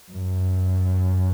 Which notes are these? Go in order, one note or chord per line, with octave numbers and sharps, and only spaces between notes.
F#2